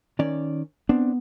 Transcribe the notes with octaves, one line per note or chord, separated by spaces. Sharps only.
D#3 C#4 D5
B3 C4 D4